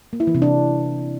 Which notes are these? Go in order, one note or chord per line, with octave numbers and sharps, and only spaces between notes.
A#3
E4
E3
C3
D4